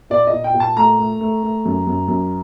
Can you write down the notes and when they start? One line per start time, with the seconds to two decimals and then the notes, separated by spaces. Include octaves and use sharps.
0.10 A#2 D5
0.27 D#5
0.32 A#2
0.44 G5
0.54 A#2
0.60 A5
0.76 A3 A#5
0.99 A3
1.21 A3
1.43 A3
1.65 F#2
1.87 F#2
2.08 F#2